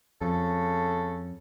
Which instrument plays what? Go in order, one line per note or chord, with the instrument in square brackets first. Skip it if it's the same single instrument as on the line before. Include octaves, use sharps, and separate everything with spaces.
[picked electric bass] F2 [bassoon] C#3 [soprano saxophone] A4